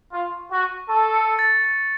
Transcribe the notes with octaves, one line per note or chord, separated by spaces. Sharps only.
F4 C#6
C#6
F#4
C#6
A4 C#6
C#7
A6
A6